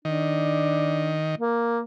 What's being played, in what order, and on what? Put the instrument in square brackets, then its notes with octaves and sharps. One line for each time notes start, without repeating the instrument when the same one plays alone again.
[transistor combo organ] D#3 [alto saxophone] D4
[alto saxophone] A#3